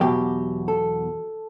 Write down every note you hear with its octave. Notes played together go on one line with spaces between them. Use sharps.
E2 B2 F#3 G4
A4